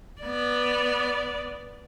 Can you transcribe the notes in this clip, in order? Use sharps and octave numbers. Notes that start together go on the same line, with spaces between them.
B3 D5